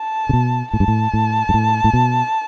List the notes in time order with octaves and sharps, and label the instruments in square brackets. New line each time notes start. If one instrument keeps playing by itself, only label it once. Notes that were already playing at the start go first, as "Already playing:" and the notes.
Already playing: [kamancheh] A5
[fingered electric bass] C#3
B2
[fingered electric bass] A2 [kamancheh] A5
[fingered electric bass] G2
A2
A2
G2
A2
A2
B2